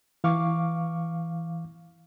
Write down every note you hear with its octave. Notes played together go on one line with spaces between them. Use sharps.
E3 F5 C#6 D6